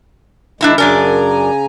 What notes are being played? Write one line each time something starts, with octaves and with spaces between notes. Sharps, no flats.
D#3 G#3 D4 E4 A#5
F#2 C#3 D4 A#4 G#5 A#5